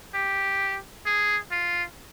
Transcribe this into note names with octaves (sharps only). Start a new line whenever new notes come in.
G4
G#4
F4